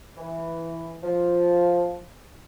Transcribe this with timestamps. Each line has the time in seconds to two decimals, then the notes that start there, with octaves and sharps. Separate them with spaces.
0.17 E3
1.04 F3